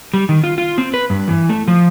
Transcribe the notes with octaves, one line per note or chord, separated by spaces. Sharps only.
G3
D#3
F4
F4
C4
B4
G2
E3
A3
F3